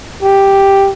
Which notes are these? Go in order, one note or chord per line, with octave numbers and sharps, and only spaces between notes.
G4